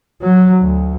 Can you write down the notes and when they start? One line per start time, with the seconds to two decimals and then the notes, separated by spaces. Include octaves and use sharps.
0.21 F#3
0.61 D2